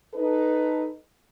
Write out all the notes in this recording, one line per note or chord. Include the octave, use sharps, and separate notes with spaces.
D#4 A4 B4